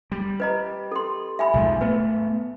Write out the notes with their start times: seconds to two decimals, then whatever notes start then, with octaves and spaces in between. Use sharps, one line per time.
0.12 G3
0.40 B4 D#5 A#5
0.92 A4 C6
1.39 E5 G#5 B5
1.54 B1 G#2 F3
1.81 A3 B3 B4